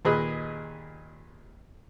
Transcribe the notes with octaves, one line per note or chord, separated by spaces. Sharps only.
D#2 A#2 G#4 B4 D#5 B5